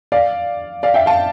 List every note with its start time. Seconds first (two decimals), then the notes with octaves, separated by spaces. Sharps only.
0.12 D5 F5
0.83 D5 F5
0.94 E5 G5
1.06 F5 A5